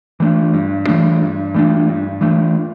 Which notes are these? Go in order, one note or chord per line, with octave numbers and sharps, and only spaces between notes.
E3 A3 D4
G2
E3 A3 D4
G2
E3 A3 D4
G2
E3 A3 D4